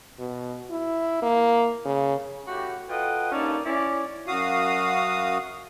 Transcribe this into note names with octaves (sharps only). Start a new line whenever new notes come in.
B2
E4
A#3
C#3
A2 F#4 G4
F4 A4 B4 D#5 F#5 G5
G2 A#3 C#4 D#4 D5 A5
C#4 E4 D5
F#2 F#4 F5 D#6